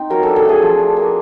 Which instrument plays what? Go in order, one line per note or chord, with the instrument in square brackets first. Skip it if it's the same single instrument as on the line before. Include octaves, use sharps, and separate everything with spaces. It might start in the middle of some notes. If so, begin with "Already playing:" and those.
Already playing: [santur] C4 D#4
F#3 A#4
D4 A4
A4
A3 G#4
F3
D4
A#3